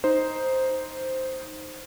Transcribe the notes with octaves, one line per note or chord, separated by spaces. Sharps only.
D#4 C5